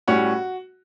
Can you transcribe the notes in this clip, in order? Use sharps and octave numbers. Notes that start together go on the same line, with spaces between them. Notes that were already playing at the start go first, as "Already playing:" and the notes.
A2 G3 C#4 F#4